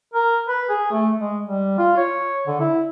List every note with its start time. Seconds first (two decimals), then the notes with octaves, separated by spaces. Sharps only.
0.14 A#4
0.48 B4
0.69 G#4
0.92 A3
1.19 G#3
1.44 G3
1.78 F4
1.97 C#5
2.47 D3
2.60 E4